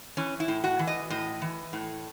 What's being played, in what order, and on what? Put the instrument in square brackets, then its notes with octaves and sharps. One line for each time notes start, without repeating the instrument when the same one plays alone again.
[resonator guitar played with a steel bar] E3 C#4
E4
A2
F#4
E3
D#5
A2 D#5
E3
A2